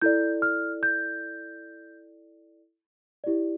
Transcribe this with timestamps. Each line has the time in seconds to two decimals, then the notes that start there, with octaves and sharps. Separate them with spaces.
0.02 E4 A4 D5 G6
0.42 F6
0.83 G6
3.24 E4 G4 D5